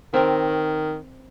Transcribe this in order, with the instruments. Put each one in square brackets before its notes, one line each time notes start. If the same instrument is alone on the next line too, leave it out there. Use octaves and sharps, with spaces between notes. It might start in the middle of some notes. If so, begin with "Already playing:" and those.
[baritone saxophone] D#3 [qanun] C4 A#4